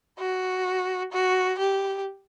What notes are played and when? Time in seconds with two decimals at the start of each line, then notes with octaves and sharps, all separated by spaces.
0.19 F#4
1.12 F#4
1.59 G4